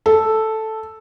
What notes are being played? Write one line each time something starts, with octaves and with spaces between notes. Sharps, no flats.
A4